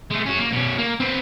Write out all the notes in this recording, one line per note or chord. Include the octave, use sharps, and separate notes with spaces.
G#3 A3
C#4 F#4
A#3
B2 C#4
A#3 A#4
C4 B4